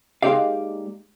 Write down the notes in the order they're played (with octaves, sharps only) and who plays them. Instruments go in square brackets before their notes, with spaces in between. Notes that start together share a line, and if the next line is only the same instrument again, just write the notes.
[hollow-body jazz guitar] G#3 A#3 D#4 G4 D5 F5